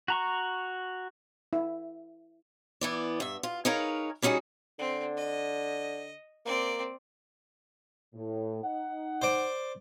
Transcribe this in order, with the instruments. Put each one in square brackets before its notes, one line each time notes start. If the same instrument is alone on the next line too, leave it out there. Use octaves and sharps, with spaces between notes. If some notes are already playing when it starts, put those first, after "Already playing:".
[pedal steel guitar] F#4 A#5 C#6
[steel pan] E4
[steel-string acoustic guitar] E3 B3 D5
G2 E5
F4
D#4 G#4 A#4 B4 C#5 F5
G3 C#4 D#4 F#4 G#4
[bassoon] D3 [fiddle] C4
[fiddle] D#5
[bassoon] A#3 [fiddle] C4 D5
[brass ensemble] A2
D#4 F#5
[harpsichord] C5 D5